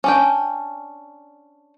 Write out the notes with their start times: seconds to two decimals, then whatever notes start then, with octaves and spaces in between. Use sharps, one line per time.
0.04 C#4 D4 G5